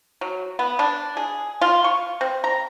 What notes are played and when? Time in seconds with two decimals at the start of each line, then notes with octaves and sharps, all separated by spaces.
0.21 F#3
0.59 B3
0.79 D4
1.17 G#4
1.61 F4
1.84 C#6
2.21 C4
2.44 A#5